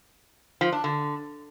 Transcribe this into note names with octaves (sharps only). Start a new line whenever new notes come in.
F3
D4
D3